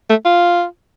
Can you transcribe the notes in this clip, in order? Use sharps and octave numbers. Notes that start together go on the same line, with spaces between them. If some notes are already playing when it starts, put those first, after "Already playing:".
A3
F4